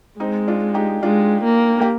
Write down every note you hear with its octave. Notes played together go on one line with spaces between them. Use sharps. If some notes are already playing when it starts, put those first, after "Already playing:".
G#3 C4 D#4
D4 F4
D#4 G4
G#3 D4 F4
A#3
G4